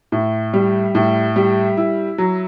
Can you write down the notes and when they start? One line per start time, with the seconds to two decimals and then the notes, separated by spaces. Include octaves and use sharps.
0.12 A2
0.53 G3
0.95 A2
1.36 G3
1.77 E4
2.18 F#3